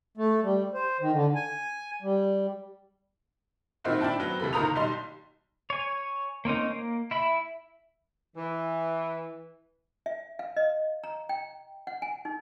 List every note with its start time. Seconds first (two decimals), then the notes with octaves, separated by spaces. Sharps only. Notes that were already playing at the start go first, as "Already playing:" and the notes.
0.17 A3
0.43 G3
0.74 C5
1.00 D#3
1.12 D3
1.35 G#5
2.02 G3
3.84 A#2 D#3 C4 D#4 E4 F#4
4.01 D4 E4 G5 A5
4.20 F#3 B3 C4
4.40 D#2 C3 E3 A4 B5
4.53 F#1 A#2 D#3 A#5 D#6 F7
4.75 B1 G3 D#4 C6
5.70 C#5 G#5
6.45 A#3 C4 C#4 D#4
6.70 A#3
7.11 E4 E5 B5
8.36 E3
10.06 E5
10.39 F5
10.56 D#5
11.04 A#5
11.29 G5
11.87 F#5
12.02 G#5
12.25 D#4